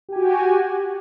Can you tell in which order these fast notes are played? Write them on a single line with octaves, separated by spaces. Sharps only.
G4 G#5 F#4